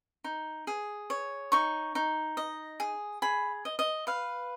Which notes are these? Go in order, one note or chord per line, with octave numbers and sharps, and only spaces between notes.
D#4
G#4
C#5
D#4 C#6
D#4
D#5
G#4
G#4 B5
D#5
D#5
B4 F5